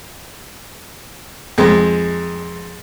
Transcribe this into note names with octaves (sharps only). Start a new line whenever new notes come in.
F2 G#3